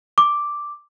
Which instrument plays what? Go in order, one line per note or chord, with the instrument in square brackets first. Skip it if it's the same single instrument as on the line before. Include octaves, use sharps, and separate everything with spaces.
[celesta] D6